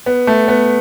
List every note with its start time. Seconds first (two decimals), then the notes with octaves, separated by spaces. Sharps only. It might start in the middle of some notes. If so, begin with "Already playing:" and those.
0.06 B3
0.27 A3
0.48 B3